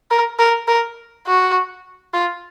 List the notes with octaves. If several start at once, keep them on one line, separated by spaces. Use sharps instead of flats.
A#4
A#4
A#4
F#4
F4